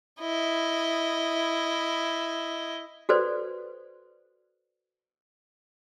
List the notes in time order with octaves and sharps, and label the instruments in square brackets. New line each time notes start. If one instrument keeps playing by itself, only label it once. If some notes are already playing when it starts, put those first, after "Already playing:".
[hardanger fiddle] E4 D#5
[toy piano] F#4 A4 B4 C5 D5